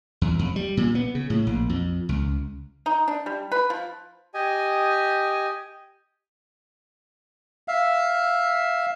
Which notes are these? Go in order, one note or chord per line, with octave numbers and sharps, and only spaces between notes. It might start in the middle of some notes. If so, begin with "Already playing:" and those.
E2
F2
G3
A#2
B3
C#3
A2
A#1
F2
C#2
D#4
D4
G3
B4
F3
G4 D#5 G#5
E5 F5